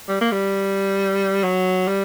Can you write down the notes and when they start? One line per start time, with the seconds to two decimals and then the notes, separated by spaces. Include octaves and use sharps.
0.09 G3
0.21 A#3
0.32 G3
1.44 F#3
1.88 G3